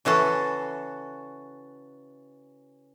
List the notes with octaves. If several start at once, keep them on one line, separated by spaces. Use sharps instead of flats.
C#3 E3 F#4 A4